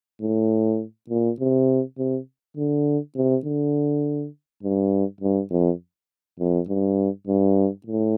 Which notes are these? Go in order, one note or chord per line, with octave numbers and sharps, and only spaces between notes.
A2
A#2
C3
C3
D3
C3
D3
G2
G2
F2
F2
G2
G2
A2